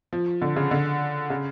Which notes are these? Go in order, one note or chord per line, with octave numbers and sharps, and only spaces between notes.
F3
D3
C#3
D3
C#3